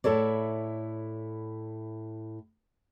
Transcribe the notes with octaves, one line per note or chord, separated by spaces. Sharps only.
A2 E4 A4 C#5 D5